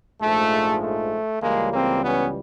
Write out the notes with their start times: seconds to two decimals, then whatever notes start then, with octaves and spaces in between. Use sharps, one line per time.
0.21 A#1 G#2 F3 G#3 A3
0.82 A3
1.42 C#2 C#3 E3 G3 G#3 A#3
1.73 A#3 C4
2.03 B3 C#4